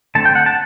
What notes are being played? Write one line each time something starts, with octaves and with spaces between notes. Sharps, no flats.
D3 A3 C4 A5
G5
F#5
A5